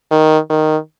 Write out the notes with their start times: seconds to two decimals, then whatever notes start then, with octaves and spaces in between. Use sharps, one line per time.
0.11 D#3
0.50 D#3